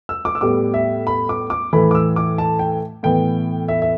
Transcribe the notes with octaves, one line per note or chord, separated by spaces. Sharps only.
E6
D6
E6
A2 G3 B3 D6
E5
B5
D6
D6
A2 E3 A3 B5
D6
E6
D6
A5
G5
A2 E3 B3 G5
E5
E5